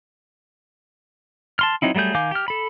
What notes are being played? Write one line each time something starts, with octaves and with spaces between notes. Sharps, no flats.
A5 C6 F6
F#3 C4 D#4 E4
F#3 G3 A3 G#4 G6
D#3 F5 G#5 D6 G6
G4 F6
A4 B5